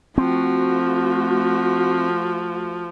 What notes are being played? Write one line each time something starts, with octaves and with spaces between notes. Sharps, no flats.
F3 A3 C4 F#4